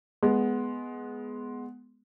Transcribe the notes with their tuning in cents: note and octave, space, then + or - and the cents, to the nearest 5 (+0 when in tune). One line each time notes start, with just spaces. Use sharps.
G#3 +10 B3 +0